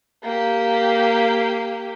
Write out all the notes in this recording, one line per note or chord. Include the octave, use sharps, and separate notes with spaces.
A#3 G4